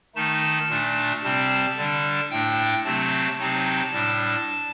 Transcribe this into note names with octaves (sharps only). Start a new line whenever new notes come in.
D#3 A3 D#4 A5
A#2 A3 D4
C3 G3 C4 A5
D3 G3 D4
A2 A3 D4 G5
C3 F#3 A3 C4 A5
C3 F#3 C4 D#4
A2 G3 D4